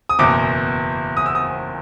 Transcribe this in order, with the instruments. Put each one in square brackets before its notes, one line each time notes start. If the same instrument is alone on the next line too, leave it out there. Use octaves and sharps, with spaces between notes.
[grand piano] D#6
F#1 E2 B2 D6
D#6
E6
D#6